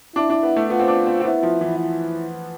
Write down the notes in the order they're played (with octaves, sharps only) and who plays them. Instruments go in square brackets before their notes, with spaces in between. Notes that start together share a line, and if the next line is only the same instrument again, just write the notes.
[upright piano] D4 [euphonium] E4
[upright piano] D4
B3
A3
[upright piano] B3 [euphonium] F4
[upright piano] C4
D4
C4
C4
[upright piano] B3 [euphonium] E4
[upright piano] F3
E3
[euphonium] E4